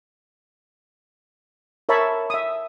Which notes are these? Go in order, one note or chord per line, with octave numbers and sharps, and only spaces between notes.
A#4 C#5 E5 A5 B5
E5 D#6